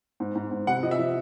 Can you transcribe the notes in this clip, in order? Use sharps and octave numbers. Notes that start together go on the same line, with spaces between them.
G#2
G#2
G#2
C3 F#5
F3 D#5
E5
F3